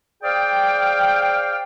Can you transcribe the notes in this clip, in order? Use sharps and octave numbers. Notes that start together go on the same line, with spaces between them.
G#4 C5 D5 F5 G5